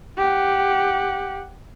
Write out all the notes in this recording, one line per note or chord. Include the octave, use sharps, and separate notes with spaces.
G4 F#5